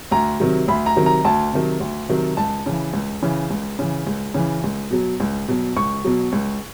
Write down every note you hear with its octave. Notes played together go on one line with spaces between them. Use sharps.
D2 A#5
C3 D#3 F#3
D2 B5
A#5
C3 D#3 F#3
A#5
D2 A5
C3 D#3 F#3
D2
C3 D#3 F#3
C#2 A5
C#3 E3
C#2
C#3 E3
C#2
C#3 E3
C#2
C#3 E3
C#2
B2 F#3
C#2
B2 F#3
C#2 C#6
B2 F#3
C#2